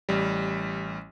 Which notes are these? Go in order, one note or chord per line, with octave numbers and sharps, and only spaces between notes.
A1 G3